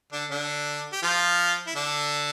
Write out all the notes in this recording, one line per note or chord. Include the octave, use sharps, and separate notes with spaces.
D3 D4
D3 D4
G4
F3 F4
E4
D3 D4